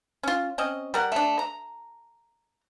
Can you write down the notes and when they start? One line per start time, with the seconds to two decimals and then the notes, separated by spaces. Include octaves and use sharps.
0.23 C#4 F4
0.58 C4 C#4 D#5
0.94 G3 A#4 F#5
1.12 A3 D4
1.39 A#5